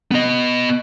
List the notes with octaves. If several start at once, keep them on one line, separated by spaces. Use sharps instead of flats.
B3 D#5